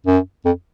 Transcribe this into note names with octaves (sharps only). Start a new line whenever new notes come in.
F#2
F2